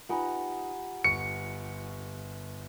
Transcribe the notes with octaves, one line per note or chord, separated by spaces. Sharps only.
D#4 F4 G4 B4 F#5 G#5 A#5 B5
G1 C#6 C#7 D7